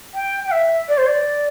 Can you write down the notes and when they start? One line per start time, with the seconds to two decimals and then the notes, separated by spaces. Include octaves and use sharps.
0.14 G5
0.46 G5
0.51 E5
0.88 D5
0.98 C5
1.07 D5